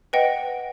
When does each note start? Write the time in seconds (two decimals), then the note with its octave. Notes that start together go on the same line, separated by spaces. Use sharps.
0.13 B4 D#5 F#5 G5